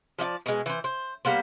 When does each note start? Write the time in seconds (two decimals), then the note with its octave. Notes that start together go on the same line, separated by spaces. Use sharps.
0.19 F3 D5 D#5 A5
0.46 B2 G#3
0.66 E3 C5
0.84 C5
1.25 G3 A#3 B3 C5